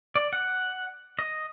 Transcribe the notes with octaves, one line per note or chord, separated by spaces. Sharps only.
D5
F#5
D#5